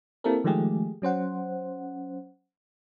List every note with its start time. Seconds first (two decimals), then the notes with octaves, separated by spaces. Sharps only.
0.24 A#3 C4 E4 G4 A4 A#4
0.44 D#3 F3 G#3 A3 G4 G#4
1.02 F#3 C#4 C5 F#5